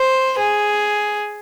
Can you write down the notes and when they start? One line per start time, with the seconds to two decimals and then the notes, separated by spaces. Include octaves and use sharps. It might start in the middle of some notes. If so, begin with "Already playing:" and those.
Already playing: C5
0.38 G#4